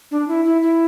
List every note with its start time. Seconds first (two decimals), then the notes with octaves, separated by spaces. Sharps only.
0.11 D4
0.28 E4
0.45 E4
0.62 E4